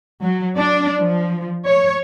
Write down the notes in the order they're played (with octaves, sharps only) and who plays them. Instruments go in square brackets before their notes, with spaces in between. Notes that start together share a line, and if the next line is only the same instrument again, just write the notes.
[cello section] F#3
D4
F3
C#5